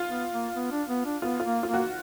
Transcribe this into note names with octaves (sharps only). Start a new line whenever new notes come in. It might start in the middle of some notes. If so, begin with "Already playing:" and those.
Already playing: F4
B3
A#3
B3
D4
B3
D4
B3 F4
F4
A#3
A#3 F4
F#4